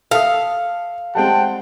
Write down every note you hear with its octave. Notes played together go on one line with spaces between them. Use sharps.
A4 E5 F5 D#6
G3 G#3 C4 F#5 G5 A5